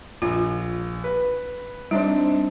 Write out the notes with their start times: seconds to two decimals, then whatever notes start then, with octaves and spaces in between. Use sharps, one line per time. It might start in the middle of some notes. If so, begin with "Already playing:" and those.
0.22 A#1 F4
1.04 B4
1.91 G3 C4 D4 D#4